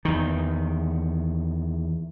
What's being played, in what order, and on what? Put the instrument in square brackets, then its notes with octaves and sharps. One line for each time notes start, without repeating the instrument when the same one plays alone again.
[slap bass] E2 D#3